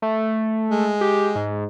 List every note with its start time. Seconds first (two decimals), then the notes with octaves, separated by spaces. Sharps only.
0.02 A3
0.71 G#3
1.01 G4
1.35 G#2